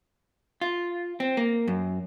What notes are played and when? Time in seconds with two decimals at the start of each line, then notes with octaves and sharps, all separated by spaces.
0.61 F4
1.20 C4
1.37 A#3
1.68 F#2